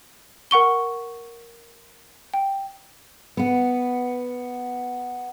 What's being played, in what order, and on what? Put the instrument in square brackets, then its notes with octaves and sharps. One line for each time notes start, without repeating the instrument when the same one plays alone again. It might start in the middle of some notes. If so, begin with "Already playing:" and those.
[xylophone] A#4 F#5 C#6 G7
G5
[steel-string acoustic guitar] B3 F#5